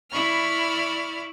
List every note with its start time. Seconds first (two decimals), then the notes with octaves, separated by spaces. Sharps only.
0.11 E4 D5 B5 C#6 F6